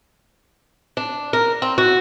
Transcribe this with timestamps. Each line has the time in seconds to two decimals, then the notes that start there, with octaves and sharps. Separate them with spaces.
0.97 D4
1.33 A#4
1.62 C4
1.78 F#4